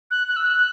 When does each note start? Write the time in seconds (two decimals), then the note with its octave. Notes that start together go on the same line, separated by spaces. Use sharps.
0.11 F#6
0.28 F#6
0.36 E6
0.44 F#6